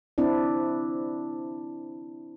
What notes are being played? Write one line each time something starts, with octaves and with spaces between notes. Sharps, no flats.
C4 D4 E4 D5